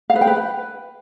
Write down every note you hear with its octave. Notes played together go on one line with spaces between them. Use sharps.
F5
B4
G5
B4